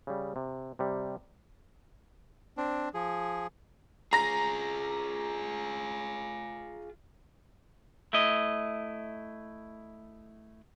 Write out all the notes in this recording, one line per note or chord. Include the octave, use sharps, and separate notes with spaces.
C#3 G3
C3
C3 G3
C4 D4
F3 G#4
F4 G#4 A#5 A#6
A3 E4 D#5